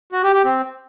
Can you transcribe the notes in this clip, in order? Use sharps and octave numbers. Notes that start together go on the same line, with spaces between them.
F#4
G4
G4
C4